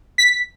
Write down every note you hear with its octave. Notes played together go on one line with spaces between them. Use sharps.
B6